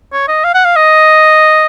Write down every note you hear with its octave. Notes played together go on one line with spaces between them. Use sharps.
C#5
D#5
F5
F#5
F5
D#5